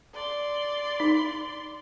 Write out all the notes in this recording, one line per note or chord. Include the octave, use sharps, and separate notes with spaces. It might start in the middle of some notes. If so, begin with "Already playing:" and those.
D5 C6
D#4